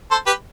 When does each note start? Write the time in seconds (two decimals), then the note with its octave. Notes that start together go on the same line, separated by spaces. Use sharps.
0.11 A4 C5
0.26 G4 B4